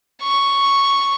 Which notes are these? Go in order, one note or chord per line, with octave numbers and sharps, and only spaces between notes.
C#6